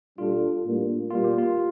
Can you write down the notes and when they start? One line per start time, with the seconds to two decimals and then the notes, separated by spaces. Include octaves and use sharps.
0.18 A#2 G3 D4 F4 A4
0.65 A2 G3 A#3 D4
1.11 A#2 G3 A#3 F4
1.24 G4
1.38 F4